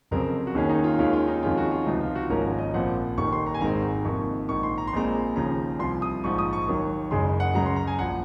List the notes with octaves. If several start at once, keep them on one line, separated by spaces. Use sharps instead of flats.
F1 F2 C#3 F#3 C4 A#4
F#4
D#2 D#3 A#3 C#4 G#4
D#4
F4
D#2 D#3 G#3 C#4 F4
F4
D#4
F2 D#3 G#3 C#4 F4
F#4
F4
C#2 C3 F3 D#4
F4
F#4
G#1 G#2 F3 A#3 C#4 A#4
A#4
D#5
A#1 A#2 F3 C4 F#5
F1 D#2 D#3 A#3 C#6
C6
A#5
G#5
G#1 G#2 D#3 G#3 C4 A#5
F2 C3 D#3 A#3 C#6
A#1 G#2 D#3 C#6
C6
A#5
C6
A#1 A#2 G#3 C4 A#5
D#2 C#3 F3 A#5
C2 C3 F3 C6
D#6
A#1 G#2 F3 C#6
D#6
C#6
D#2 D#3 F#3 A#3
F#1 F#2 C#3 G#3 C6
F#5
C#2 C#3 F#3 A#5
C6
A#5
G#5
A#1 F3 F#5